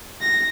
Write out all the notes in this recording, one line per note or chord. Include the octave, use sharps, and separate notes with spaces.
A#6